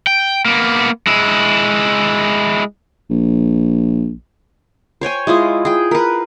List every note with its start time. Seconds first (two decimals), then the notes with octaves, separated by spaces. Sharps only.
0.07 G5
0.45 A#3 B3
1.07 G#3 E4
3.10 A#1
5.01 C5 C#5 G5 G#5
5.27 G#3 E4 F4 D#5
5.65 G#4 G5
5.91 A#4 B4